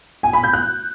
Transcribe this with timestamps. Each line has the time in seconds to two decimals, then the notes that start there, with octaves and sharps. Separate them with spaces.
0.23 G#5
0.33 B5
0.43 G6
0.53 F#6